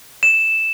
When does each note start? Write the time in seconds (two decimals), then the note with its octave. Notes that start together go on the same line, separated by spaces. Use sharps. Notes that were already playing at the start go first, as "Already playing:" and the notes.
0.23 E7